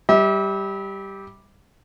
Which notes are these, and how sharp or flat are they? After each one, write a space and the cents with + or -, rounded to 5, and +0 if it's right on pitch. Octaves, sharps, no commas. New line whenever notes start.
G3 +0 E5 -35